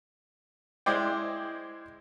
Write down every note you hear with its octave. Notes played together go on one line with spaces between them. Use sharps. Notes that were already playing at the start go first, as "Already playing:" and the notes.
G#3 E4 C5 D5 G5